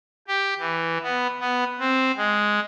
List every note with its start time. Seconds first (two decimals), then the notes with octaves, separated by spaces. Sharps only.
0.28 G4
0.59 E3
1.02 B3
1.40 B3
1.79 C4
2.17 G#3